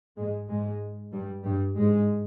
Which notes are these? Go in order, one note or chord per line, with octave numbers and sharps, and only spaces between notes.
G#2 G#3
G#2 G#3
G2 G3
G2 G3
G#2 G#3